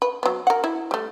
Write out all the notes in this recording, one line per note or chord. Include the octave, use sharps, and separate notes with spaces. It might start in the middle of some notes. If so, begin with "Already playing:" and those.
B4
F#3 B3
A#4 F#5
E4
G3 A3